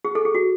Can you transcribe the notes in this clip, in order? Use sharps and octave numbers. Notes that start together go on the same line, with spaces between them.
G#4
A4
G#4
F#4